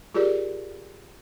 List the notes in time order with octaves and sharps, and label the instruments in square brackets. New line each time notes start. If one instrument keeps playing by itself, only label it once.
[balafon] F4 G4 G#4 A#4 D5